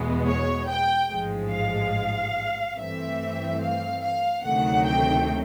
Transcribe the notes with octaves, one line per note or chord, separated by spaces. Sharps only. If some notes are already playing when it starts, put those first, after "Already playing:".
Already playing: E2 B2 G#3 B3
C#5
G5
A1 G#2 F3 G#3
F5
G2 E3 A3 C4 E5
F5
F5
D2 C3 D#3 F#3 A3 F#5
G5